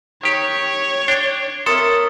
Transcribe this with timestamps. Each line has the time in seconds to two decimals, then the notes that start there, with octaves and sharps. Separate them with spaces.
0.23 D#3 G4 C#5
1.08 D4 G5
1.66 A4 A#4 C#5 E5 C6 D#6 A6